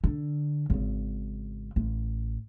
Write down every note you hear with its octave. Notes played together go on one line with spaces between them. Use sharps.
D3
G#1 C#3
A1